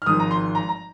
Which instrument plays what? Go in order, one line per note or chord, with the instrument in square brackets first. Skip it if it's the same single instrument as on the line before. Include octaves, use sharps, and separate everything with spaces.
[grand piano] F6
G#1 G#2 F3 D#6
A#5
C6
A#5
A#5